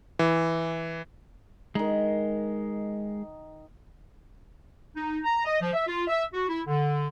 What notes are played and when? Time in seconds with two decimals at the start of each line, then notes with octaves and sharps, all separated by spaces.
0.19 E3
1.75 D#3 G#3 D#4
4.95 D#4
5.24 A#5
5.45 D#5
5.61 F3
5.73 E5
5.86 F4
6.08 E5
6.33 F#4
6.48 E4
6.67 D3